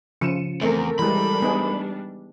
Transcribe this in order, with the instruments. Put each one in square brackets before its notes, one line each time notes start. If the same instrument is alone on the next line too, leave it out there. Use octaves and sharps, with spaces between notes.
[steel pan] C#3 F3 [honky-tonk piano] C#7 D#7 E7
[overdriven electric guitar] E2 [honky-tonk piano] A3 C4 A#4
[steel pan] E3 G#3 [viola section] G3 D4 [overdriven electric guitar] B5
[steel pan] B3 D#4 G#4